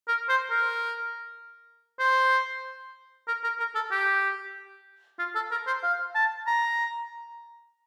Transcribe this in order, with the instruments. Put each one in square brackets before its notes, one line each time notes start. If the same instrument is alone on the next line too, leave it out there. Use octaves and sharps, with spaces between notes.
[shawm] A#4
C5
A#4
C5
A#4
A#4
A#4
A4
G4
F4
A4
A#4
C5
F5
A5
A#5